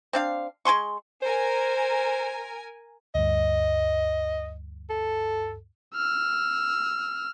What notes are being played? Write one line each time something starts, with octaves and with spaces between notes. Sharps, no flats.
C4 D4 F5
G#3 G#5 C6 C#6
A#4 C5 G#5
D2 G2 D#5
A4
E6 F6